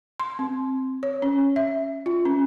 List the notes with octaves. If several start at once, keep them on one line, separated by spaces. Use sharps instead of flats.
C6
C4
C#5
C#4
E5
F4
C#4